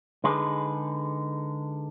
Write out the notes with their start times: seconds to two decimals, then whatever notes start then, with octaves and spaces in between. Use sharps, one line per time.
0.24 D3 G#3 D#4 G#4 B4